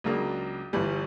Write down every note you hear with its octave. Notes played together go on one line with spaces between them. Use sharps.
C#2 C#3 F#3 A#3 D4
G1 G2 E3 G3